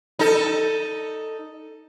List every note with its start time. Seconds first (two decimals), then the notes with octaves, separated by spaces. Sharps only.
0.19 D#4 A4